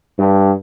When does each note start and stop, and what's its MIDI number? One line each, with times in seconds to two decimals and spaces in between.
0.17 0.52 43